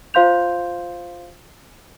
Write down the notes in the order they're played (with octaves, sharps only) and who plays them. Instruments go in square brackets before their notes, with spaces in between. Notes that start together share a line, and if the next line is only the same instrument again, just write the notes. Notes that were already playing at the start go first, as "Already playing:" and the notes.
[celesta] F4 C5 F5 C6 G6 F7